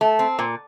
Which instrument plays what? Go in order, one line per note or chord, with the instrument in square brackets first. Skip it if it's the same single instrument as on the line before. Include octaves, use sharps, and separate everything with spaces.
[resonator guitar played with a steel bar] A3
C4
A#2